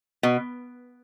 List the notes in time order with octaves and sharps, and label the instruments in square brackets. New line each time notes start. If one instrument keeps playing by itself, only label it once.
[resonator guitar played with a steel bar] B2